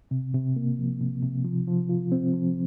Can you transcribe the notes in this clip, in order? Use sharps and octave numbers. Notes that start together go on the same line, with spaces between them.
C3
C3
A#3
F3
C3
C3
F3
F3
F4
C4
F3